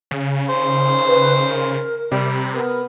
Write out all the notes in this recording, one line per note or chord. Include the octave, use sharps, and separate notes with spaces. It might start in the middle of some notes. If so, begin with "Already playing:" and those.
C#3
D#3 C5
B4
A#4
C3 G3
B3 A#4